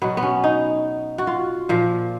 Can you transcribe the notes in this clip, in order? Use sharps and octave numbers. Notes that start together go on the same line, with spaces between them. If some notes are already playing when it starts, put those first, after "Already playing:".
B2 F#3 B3
B3
C#4
D#4
F#4
F4
A#2 F3